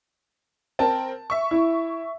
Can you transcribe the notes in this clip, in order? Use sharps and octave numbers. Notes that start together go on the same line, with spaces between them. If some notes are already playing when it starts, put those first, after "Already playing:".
C4 A#4 A5
E5 C#6
E4